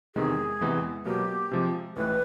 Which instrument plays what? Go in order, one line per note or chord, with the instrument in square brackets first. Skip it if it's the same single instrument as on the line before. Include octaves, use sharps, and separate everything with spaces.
[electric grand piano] E2 C3 D#3 G#3 [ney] G#4
[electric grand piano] E2 C3 E3 G#3 B3
[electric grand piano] B2 F#3 A#3 [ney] G4
[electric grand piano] C3 F3 G#3
[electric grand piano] A1 A2 E3 [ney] B4